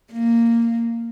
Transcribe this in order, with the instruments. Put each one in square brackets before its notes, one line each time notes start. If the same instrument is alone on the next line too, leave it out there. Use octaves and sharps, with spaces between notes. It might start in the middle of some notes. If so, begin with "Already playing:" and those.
[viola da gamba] A#3